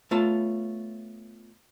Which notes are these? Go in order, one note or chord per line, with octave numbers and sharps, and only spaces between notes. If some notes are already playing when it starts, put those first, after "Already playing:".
A3 B3 F4 C#5 A5